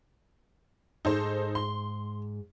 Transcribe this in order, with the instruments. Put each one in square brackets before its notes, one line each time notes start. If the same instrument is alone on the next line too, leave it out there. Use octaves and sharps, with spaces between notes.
[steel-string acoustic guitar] G#2 [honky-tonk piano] D#4 A4 C5
[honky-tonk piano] C6